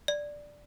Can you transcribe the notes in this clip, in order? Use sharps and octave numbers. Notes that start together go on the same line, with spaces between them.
D5